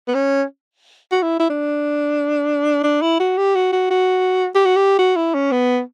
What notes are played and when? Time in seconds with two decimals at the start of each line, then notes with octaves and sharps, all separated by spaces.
0.08 B3
0.15 C#4
1.12 F#4
1.22 E4
1.40 E4
1.50 D4
2.83 D4
3.02 E4
3.20 F#4
3.37 G4
3.55 F#4
3.73 F#4
3.91 F#4
4.55 G4
4.65 F#4
4.76 G4
4.99 F#4
5.16 E4
5.34 C#4
5.52 B3